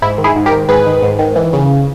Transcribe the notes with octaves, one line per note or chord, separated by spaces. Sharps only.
G#2 E4
D#3
E4 G#4
G#2
G4 A#4
D#3
G#2 G#4 B4
D#3
G#2
D#3
E3
C#3